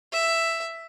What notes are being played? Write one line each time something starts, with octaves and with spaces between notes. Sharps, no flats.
E5